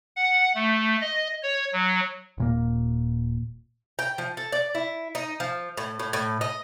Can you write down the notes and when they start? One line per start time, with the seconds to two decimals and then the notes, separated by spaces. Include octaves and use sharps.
0.16 F#5
0.55 A3
1.01 D#5
1.43 C#5
1.73 F#3
2.38 D#1 A#2 A#3
3.99 G5
4.18 F3
4.37 A4
4.52 D5
4.75 E4
5.15 D#4
5.40 F3
5.77 A2
5.99 A2
6.13 A2
6.41 D#5